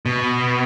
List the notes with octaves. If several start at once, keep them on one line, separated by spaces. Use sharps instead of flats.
B2